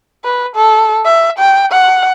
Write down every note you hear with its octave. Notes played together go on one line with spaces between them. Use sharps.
B4
A4
E5
G5
F#5